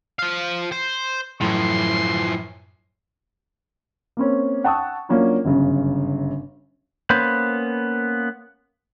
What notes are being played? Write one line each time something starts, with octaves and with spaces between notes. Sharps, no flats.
F3 F5
C5
F#2 A2 E3 F3 E4 C6
A#3 C4 C#4
F#5 G5 A5 C#6 D#6 E6
F#3 A#3 C#4 D4 F4
G1 F#2 C#3
A#3 B3 C#4 B4 C5